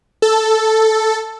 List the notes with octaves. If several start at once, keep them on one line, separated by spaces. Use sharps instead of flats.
A4